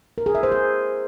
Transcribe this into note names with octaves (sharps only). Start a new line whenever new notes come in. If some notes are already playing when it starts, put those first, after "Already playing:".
A#4
G#4
E5
C5
G#4